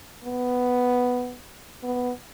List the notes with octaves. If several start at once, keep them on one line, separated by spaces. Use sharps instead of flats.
B3
B3